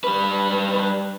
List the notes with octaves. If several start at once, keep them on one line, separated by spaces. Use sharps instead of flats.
G3 B4